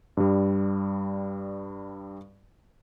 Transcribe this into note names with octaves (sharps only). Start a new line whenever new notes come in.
G2 G3